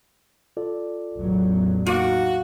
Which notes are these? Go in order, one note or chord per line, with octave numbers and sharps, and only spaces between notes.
F4 A4 D5
A1 E2 F#3
A#3 D#4 F#4 F5